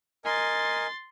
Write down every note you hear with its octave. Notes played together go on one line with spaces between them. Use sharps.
A#4 D#5 G#5 C6 A6